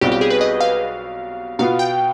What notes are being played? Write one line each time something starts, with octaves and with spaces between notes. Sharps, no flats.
B1 B2 G3 C4 F4 G4
G4
G#4
B4
D#5
F5
B2 B3 F4 F5
G5